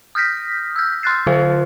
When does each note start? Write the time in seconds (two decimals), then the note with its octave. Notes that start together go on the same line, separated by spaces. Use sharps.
0.15 D#6 F6 G6 A#6 B6
0.76 E6 F6 G6
1.03 C6 F6 F#6 A6 C7
1.27 D3 F4 C5 F5